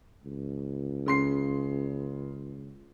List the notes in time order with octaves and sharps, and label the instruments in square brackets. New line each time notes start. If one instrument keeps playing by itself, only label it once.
[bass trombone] C#2
[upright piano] C#3 C6 C7